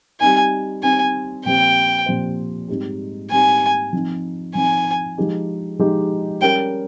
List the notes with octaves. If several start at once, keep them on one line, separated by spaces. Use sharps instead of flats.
G3 C4 D#4 G#5
G3 C4 D#4 G#5
A#2 F3 C4 G4 C5 G5
A#2 F3 C4 G4 C5
G#2 G3 C4 D#4 G4
G#2 G3 C4 D#4 G4 G#5
F3 C4 D#4
F3 C4 D#4 G#5
F3 G#3 D#4 G4
F3 G#3 D#4 G4
G3 C#4 G4 A#4 G5